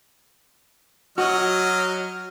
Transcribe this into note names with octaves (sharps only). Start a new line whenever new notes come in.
F#3 F#4 D#5 F6